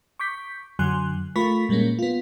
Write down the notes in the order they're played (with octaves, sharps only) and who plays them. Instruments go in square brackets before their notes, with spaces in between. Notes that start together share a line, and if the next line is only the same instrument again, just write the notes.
[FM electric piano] C#6 D6 G6 B6
F#2 D3 F#3 G#5 C6 F#6
A3 F4 A#4 B5 C#6 B6
A#2 G3 G#3 A#3 C#4
B3 F4